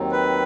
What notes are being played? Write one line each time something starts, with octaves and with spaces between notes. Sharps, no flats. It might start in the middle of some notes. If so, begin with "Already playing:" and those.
Already playing: D#2 D#3 F#3 C4 D#4
B4